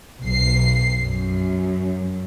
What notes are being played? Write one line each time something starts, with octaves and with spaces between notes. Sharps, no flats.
B1 C7
F#2